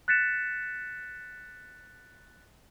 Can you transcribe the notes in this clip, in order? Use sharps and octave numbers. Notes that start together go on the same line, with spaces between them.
F#6 A6 B6 C#7 E7